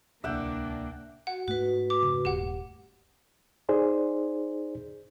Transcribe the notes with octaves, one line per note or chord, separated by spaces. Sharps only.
D1 C2 A#3 D4 E5 F#5 G5
F#4 F#5
G#2 A3 F4 F#4 B4
D6
F2 C#3
D#1 G4 F#5
D#4 G#4 C5 D5